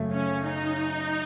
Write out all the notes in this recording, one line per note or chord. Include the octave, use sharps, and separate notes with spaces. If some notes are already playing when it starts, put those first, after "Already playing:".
Already playing: F#2 C#3 A3
C#4
D#4